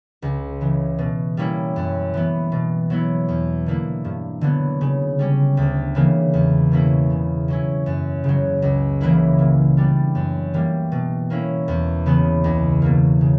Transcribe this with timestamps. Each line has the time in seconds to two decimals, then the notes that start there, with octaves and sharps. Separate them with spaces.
0.22 C#2
0.61 C#3 E3
0.99 B2
1.37 G3 A#3 C#4 E4
1.76 F#2
2.14 E3 B3
2.52 B2
2.90 F#3 B3 E4
3.28 E2
3.66 D3 A#3 E4
4.04 G2
4.41 D3 F#3 B3
4.81 C#3
5.19 G3 C#4
5.57 D2
5.95 C#3 E3 A#3
6.34 E2
6.71 B2 A#3 C#4 E4
7.10 C#3
7.48 F#3 C#4 E4
7.86 F#2
8.24 C#3 F#3
8.62 C#2
9.01 C#3 E3 A#3 E4
9.39 A#2
9.77 G3 B3 D4
10.15 F#2
10.53 E3 G3 A#3
10.92 B2
11.30 A#3 C#4 E4
11.68 E2
12.06 C#3 E3 B3
12.44 C#2
12.82 B2 A#3
13.21 C#3